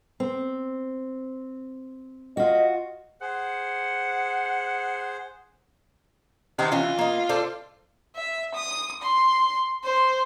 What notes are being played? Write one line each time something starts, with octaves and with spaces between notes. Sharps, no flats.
C4
F4 F#4 D#5
G#4 C5 F#5
C3 D#3 D#5 F#5
E3 C#4 F4
A#3 D#5
A4 C5 D5
E5
D#6
C6
C5